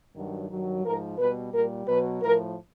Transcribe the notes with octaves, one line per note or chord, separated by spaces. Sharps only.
G2 D#3 F#3
G2 D#3 F#3
G#2 F3 A#4
B2 G3 B4
A#2 G3 A#4
B2 F#3 B4
A2 F3 A#4